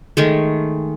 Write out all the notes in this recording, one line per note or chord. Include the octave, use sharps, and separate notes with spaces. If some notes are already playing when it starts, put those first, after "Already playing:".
D#3 G#3 A3